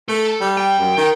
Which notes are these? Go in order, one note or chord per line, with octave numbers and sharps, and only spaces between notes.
A3 A4
G3
G5
F#2
D#3